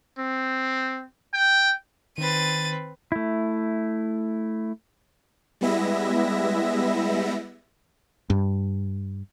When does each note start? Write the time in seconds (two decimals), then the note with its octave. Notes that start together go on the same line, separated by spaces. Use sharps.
0.18 C4
1.33 G5
2.18 D#3 C4 B4 A6 D#7
3.12 A3 E4
5.61 G3 G#3 B3 E4 E5 A#6
8.30 G2